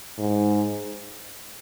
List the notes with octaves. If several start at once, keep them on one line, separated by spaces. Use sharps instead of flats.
G#2